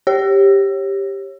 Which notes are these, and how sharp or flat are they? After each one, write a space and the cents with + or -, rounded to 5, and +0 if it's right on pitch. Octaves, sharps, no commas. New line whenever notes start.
G4 +5 C#5 -25